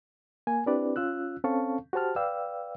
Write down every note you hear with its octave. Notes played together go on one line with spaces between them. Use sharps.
A#3 G#5
C4 D4 E4 G4 B4 D5
C#4 F4 E6 F#6
C4 C#4 A4 F5 A5 C#6
F#4 G4 C5 A5 F6
B4 D5 F5 G5 E6